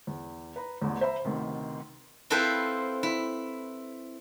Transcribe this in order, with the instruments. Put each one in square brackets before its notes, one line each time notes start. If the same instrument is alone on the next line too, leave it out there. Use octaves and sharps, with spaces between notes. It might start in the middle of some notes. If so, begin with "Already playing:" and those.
[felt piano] E2
B4 A#5 B5
A1 E2
C5 E5 A#5 B5
A1 D2 C3 D#3
[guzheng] C4 E4 F4 A4 B4 C5
E4